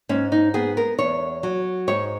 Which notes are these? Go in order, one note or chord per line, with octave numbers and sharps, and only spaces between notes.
G#2 C#4
D#4
B3 G#4
A#4
E2 C#5
F#3
G#2 C#5